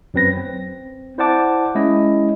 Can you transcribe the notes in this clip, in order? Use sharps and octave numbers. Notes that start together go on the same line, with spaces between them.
F#2 F#3 C4 B4 A#6
C4
E4 C5 D5 F#5 A5 D6
G#3 C#4 E4 D#5